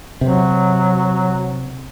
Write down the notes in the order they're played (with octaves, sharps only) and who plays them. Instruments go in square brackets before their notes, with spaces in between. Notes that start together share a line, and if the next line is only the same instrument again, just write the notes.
[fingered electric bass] C3 [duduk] F#3